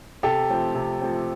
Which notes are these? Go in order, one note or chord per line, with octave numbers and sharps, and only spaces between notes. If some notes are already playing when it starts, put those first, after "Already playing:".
C3 G4 A4
F3 A3 C4
C3
F3 A3 C4